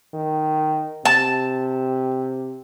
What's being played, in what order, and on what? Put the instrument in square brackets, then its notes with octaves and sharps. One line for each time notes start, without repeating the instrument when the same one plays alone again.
[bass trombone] D#3
[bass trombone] C3 [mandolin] A5